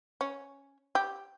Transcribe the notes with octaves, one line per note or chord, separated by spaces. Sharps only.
C#4
G4